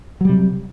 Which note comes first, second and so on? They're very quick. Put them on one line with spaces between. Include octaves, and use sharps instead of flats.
F#3 G3 C3